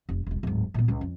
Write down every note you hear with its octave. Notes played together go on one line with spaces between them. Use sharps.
F1
E1 C2
D1 G#2
A#2 B3
C#2 C#4
F2